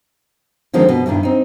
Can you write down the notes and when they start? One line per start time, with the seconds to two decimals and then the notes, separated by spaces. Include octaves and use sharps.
0.73 D3 D#3 F3 G#3 C4 D4
0.89 B2
1.06 G2 A#2 D#3 D4 E4
1.23 C4 D#4